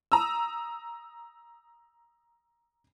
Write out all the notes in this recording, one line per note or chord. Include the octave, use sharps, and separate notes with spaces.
A#5 D#6 E6